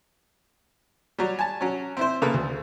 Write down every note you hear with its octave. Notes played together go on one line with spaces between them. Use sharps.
F#3 G3
G#5 A5
F#3 C#4
C4 E4 C5
C#3 A#3 A4 B4
D2